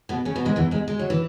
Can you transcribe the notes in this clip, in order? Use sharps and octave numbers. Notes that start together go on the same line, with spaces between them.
B2 B3
C#3 C#4
B2 B3
G#2 G#3
E2 E3
G#2 G#3
G#3
F#3
E3